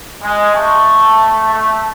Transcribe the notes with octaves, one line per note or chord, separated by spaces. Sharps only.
G#3
A3
A3